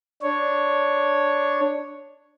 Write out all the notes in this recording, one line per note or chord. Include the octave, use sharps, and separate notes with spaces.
D4 C#5